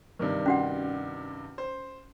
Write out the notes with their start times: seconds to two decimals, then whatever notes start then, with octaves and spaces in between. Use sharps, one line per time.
0.19 G2 C3 D#3
0.46 C#4 F#4 F#5
1.58 C5